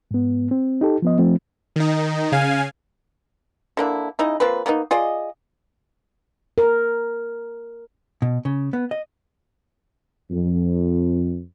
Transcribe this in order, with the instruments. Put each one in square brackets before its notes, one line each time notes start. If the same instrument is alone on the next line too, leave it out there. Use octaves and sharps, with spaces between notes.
[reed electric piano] G#2 B3
C4
D#4 G4 A4
F3 B3 D#5
F3 A3 C4
[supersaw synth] D#3 D#4
C#3 F5 G#5
[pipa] D3 A#3 D4 E4
C#3 D#4 E4 D#5
F3 A#3 C4 B4
A#3 B3 C#4 D#4
F4 G#4 D5 D#5
[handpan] A#4
[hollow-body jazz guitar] B2
C#3
B3
D#5
[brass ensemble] F2